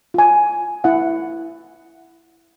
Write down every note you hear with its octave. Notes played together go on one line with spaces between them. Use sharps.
F4 G#5
E4 F#5